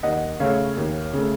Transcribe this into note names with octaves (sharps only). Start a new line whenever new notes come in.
D#2 D#5 F#5
C#3 A3 C#5 F5
D#2
C#3 A3